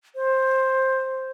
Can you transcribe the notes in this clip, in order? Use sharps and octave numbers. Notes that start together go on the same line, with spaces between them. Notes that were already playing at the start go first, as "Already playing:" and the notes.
C5